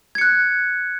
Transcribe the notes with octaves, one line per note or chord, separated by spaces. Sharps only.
F#6 G#6 C#7